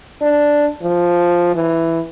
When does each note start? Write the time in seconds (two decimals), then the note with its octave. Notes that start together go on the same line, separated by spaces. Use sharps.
0.22 D4
0.83 F3
1.55 E3